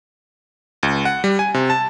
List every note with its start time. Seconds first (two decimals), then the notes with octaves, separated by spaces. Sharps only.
0.83 C#2
1.05 F#5
1.24 G3
1.39 G#5
1.54 C3
1.70 A5